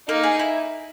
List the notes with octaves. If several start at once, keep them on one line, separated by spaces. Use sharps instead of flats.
A#3 D#4
G#4
E4